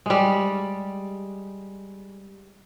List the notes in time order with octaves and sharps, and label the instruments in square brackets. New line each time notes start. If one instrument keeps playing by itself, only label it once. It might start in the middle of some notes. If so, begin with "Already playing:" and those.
[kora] G3 G#3